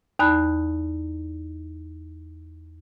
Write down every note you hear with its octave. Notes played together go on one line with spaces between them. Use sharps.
E2 D#4 D5 A5 B5 F#6